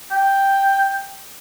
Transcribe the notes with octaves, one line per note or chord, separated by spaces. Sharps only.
G5